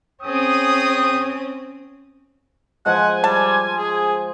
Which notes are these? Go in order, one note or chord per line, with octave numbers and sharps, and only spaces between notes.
C4 C#4 G#4 G5 D#6
F3 G#3 F#5 G#5
G3 A5
G#4